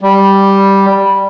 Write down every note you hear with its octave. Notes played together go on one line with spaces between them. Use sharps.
G3